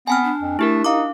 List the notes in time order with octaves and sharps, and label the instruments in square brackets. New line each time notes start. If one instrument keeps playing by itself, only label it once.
[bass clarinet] B3 [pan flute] C4 [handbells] G#5 A5 F6
[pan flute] D4
[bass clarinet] F2
[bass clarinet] A3 [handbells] E4 G4 A#4
[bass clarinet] D#4 [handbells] F5 D6